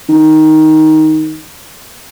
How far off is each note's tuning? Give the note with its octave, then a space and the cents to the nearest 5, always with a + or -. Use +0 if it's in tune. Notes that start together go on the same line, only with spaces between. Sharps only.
D#3 +10